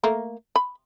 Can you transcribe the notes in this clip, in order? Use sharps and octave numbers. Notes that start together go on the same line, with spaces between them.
A3 A#3 A#4
B5